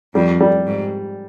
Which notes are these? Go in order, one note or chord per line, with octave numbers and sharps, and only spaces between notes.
F2 G3
G3
G#2